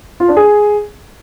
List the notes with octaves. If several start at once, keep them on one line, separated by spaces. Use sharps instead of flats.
F4
D4
G#4